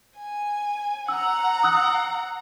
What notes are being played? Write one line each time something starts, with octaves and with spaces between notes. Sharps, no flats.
G#5
F#5 A#5 E6
D#6 E6 F#6